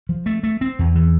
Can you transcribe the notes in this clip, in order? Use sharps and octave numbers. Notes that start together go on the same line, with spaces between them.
F3
A3
A3
C4
E2
E3